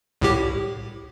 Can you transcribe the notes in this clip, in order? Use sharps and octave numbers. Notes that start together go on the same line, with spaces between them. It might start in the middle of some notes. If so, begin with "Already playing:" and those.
C2 A2 G4